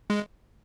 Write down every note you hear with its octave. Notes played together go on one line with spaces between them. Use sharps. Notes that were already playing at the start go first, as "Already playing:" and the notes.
G#3